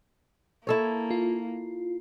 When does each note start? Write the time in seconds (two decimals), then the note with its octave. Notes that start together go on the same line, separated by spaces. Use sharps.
0.67 A#3 E4 A4 C#5
1.11 F4